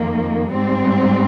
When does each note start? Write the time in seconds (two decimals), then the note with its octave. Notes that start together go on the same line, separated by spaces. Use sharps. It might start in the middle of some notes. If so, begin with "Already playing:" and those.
Already playing: F2 D#3 A#3
0.51 G#2 G3 C4